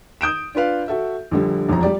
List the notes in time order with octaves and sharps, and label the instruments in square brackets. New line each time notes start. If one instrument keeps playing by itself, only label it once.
[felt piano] D#6 G6 D7 E7
D4 F4 B4 F5
F#4 A4 E5
A#1 D3 G3
E1 A#1 F2 A#5
G3 G4 D5